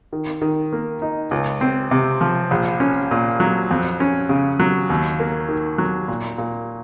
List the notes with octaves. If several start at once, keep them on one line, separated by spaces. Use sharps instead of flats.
D#3
D#3
A#3
D#4
C#2
C4
C3
F3
A#1
C#4
A#2
F#3
F2
C#4
C#3
F#3
D#2
A#3
D#3
F#3
A#2
A#2